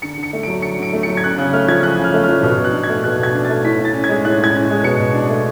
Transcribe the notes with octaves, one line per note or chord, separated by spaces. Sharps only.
D3 C#7
D3
C#7
A3
D7
F#3
D3 C#7
D3 D7
A3
C#7
F#3
G#6
C#4 F#6
C#3 F#6
A3 F6
F3 G#6
C#4 F#6
C#3
F6
A3
F6
F3
B2 F6
B2
F#6
D4
G#6
A3
B2 F#6
B2
G#6
D4
A6
A3
A2 B6
A2
A6
C#4
G#6
G#3
A2 F#6
A2 G#6
C#4
G#3
B2 C#7
B2
D4
A3